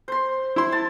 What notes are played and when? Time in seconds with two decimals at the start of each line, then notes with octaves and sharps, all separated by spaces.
0.08 C5 C6
0.56 E4 C6
0.72 A5